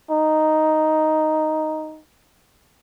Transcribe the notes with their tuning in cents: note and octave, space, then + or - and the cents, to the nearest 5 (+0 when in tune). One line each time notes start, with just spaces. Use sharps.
D#4 +0